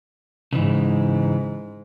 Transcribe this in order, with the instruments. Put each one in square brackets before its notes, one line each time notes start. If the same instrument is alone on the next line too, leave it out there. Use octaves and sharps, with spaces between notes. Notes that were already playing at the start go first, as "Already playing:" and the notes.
[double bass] G#2 [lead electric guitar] C#3 E3